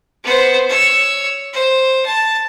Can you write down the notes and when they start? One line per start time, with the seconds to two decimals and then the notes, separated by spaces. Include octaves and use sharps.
0.24 B3 C5
0.69 C#5 E6
1.53 C5
2.05 A5